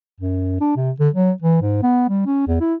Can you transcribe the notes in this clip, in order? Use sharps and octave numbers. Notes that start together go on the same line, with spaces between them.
F#2
D4
C3
D3
F#3
E3
G#2
B3
G3
C#4
E2
E4